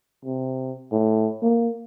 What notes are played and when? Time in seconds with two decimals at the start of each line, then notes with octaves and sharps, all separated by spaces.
0.25 C3
0.92 A2
1.42 A#3